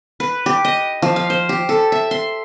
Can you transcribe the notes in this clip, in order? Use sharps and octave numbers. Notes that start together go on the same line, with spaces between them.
B4
G4
D#5
F3
F5
C5
G4
A4
E5
C6